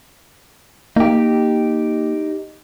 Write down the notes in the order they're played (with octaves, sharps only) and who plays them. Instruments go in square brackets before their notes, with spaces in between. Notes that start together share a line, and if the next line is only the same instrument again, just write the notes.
[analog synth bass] A#3 [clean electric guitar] D#4 G4